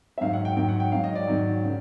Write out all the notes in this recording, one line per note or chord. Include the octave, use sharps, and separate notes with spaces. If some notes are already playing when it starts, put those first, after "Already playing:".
E5
G#2 D#3 F#3 F5
F#5
G5
G#2 D#3 F#3 G5
F#5
G5
G#2 D#3 F#3 F5
D#5
D5
G#2 D#3 F#3
C#3